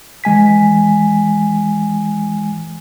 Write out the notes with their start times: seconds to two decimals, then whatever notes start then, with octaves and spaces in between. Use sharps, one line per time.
0.24 E3 G#3 G#5 B6